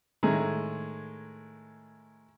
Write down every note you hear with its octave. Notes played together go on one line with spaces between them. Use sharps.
A2 D#3 G#3